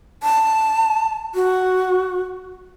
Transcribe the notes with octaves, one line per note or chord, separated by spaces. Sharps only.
A5
F#4